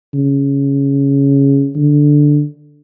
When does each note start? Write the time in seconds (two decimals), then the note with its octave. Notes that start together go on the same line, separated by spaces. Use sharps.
0.14 C#3
1.76 D3